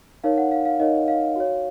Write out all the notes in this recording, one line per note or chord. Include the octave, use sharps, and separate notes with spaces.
D#4 A#4 C#5 F5
F#5
F5
F5
D#4 A#4 C#5 D#5
F5
F#4 C#5